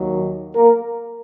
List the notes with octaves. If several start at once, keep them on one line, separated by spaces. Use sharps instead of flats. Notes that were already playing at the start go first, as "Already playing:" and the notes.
Already playing: D#2 D#3 F#3
A#3 A#4